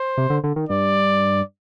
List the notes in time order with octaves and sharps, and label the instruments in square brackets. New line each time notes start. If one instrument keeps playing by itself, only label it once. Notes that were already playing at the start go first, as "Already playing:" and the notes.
Already playing: [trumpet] C5
[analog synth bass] C3
D3
D3
D#3
[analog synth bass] G2 [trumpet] D5